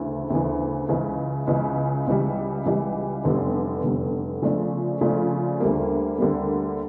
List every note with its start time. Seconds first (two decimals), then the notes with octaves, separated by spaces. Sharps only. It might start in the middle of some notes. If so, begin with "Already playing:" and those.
Already playing: D2 C#3 E3
0.30 D2 C#3 E3
0.89 C#2 C#3 E3
1.47 C#2 C#3 E3
2.07 C#2 C#3 E3 G3
2.65 C#2 C#3 E3 G3
3.24 F1 E2 D3 G3
3.83 F1 E2 D3 G3
4.42 C#3 F3 A3 D4 F4
5.01 C#3 F3 A3 D4 F4
5.60 D2 D3 G3 A#3
6.18 D2 D3 G3 A#3